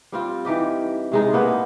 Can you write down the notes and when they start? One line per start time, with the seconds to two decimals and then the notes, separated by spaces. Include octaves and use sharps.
0.12 G3 C4 F4
0.45 E3 D#4 G4 D#5
1.12 C3 G#3 D#4
1.33 A#3 B3 D#4 E4